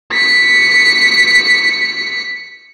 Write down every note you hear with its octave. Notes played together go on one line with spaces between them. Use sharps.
B6 C#7